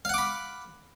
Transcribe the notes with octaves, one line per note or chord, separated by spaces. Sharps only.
F5 F#5 B5 D6